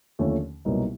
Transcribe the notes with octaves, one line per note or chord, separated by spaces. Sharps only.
D#2 D3 F3 A3 C#4
C2 B2 F#3 A#3 D#4